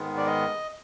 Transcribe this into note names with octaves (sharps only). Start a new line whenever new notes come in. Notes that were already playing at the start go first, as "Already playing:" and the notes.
Already playing: G#2 D#3 G#3 B3
D5
D#5